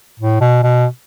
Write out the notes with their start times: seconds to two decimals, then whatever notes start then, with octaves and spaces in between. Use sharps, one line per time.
0.20 A2
0.41 B2
0.63 B2